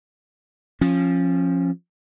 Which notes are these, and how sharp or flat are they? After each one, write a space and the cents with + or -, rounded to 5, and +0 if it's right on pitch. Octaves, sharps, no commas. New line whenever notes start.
F3 +0 C#4 -25